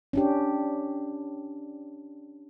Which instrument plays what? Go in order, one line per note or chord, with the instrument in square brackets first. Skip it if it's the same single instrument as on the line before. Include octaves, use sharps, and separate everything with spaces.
[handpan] C#4 D4 G4